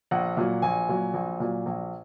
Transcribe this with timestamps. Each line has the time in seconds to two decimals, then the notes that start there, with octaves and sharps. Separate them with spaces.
0.11 A#1 F#5
0.37 A#2 F#3
0.62 A#1 G#5
0.89 A#2 F#3
1.14 A#1
1.40 A#2 F#3
1.66 A#1